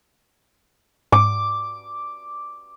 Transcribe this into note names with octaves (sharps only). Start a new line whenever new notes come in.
G#2 D6